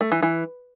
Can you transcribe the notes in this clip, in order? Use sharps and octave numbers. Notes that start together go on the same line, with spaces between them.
A3
E3
E3